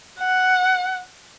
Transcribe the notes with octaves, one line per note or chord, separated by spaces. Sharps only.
F#5